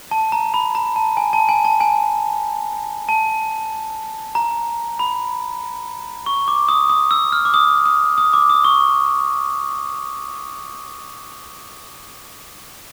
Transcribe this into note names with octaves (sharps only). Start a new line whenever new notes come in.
A5
A#5
B5
A#5
A5
G#5
A5
G#5
A5
G#5
A5
A#5
B5
C#6
D6
D#6
D#6
E6
F6
D6
D#6
D#6
D#6
D6
D#6
C#6